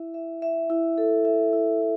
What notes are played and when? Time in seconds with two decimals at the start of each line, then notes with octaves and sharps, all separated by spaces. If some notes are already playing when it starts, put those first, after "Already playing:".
Already playing: E4 E5
0.14 E5
0.42 E5
0.70 E4
0.98 A4
1.25 E5
1.53 E4
1.81 E4